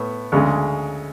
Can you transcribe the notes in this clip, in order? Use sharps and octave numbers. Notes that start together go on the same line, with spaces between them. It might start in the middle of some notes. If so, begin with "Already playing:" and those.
Already playing: A2 B3
D2 C#3 G#3